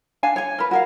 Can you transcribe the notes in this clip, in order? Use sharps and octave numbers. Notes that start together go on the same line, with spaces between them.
D4 F5 G#5
C#5 G#5
A#4 B4
F#4 A#4 F5